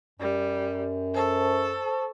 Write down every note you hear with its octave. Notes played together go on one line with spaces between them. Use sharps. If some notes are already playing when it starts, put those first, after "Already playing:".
F#2 G3
A4 C5 A5 C#6